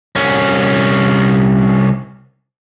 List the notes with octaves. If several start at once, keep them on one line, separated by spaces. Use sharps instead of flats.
C2 C#4